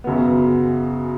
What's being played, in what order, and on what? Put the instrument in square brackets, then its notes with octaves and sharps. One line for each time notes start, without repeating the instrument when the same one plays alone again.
[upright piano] F#2 C#3 F#3 B3